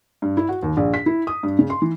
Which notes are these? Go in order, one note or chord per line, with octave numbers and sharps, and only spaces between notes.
G2
E4
F#4
D#2
A#1
B6
E4
D#6
G2
C#3
C6
E3